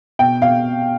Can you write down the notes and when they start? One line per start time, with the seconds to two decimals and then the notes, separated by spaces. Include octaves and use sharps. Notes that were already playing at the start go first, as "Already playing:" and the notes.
0.19 B2 G5
0.42 B2 F5